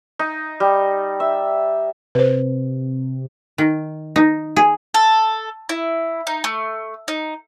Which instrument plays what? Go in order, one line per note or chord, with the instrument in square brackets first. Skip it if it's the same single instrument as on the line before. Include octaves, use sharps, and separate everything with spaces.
[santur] D#4
G3
E5
[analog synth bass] C3 [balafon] B4 C5
[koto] D#3
D#4
G#4
[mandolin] A4
E4
D#4
A3
D#4